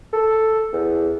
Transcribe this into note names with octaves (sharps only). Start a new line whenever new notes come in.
A4
E2